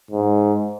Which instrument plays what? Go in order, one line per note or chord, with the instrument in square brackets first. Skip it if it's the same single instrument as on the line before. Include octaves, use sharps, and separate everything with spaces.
[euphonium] G#2